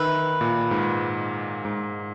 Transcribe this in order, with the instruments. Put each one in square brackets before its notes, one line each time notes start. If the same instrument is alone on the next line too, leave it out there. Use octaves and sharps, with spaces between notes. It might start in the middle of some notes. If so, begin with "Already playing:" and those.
Already playing: [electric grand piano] D#3 [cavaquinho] B4 E5
[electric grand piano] A#2
G#2
G#2